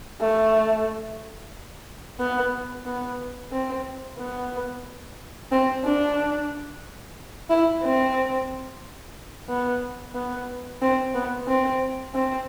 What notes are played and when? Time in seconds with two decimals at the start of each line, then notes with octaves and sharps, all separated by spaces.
0.21 A3
2.20 B3
2.86 B3
3.53 C4
4.18 B3
5.52 C4
5.84 D4
7.50 E4
7.83 C4
9.49 B3
10.15 B3
10.82 C4
11.15 B3
11.48 C4
12.15 C4